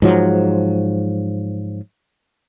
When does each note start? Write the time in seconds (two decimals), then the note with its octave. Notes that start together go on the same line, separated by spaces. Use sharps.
0.02 G#2 F3 F#3